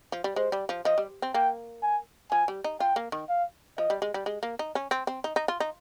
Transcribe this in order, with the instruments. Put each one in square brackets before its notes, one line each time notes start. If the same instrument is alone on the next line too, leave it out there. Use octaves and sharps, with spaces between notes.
[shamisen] F3
G3
[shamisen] G#3 [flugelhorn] C5
[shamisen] G3
F3
[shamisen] F3 [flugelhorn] D#5
[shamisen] G3
C4
[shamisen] A#3 [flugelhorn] G5
[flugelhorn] G#5
[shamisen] F3 [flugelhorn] G#5
[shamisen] G3
D#4
[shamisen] F4 [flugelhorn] G5
[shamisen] A#3
D#3
[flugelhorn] F5
[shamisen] F3 [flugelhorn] D#5
[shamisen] G3
G#3
G3
G#3
A#3
D#4
C#4
C4
C4
D#4
D#4
F4
D#4